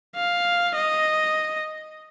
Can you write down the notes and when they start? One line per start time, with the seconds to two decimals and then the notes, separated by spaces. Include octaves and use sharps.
0.16 F5
0.75 D#5